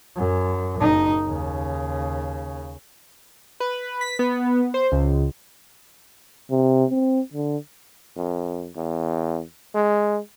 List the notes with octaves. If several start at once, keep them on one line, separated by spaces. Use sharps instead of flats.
F#2
F#1 D#4
D#2 C#3
B4
B6
B3
C5
C#2
C3
C4
D3
F2
E2
G#3